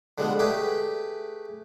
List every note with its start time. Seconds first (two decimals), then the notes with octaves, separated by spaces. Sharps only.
0.18 D3 F3 G3 G#3 B3
0.39 A3 G4 G#4 B4 G5